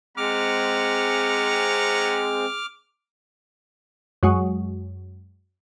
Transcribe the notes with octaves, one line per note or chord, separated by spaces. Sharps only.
G#3 C4 C#4 F#5 A#5 D6 F6
F#2 F#3 G#3